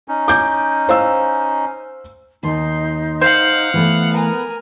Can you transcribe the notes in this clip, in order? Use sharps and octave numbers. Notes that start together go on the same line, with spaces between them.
C#4 D#4
D6 G6
C5 F5 E6
D#2 D#4 C6
C5 F5 F#5
E3 A3 B3
A#4 G#5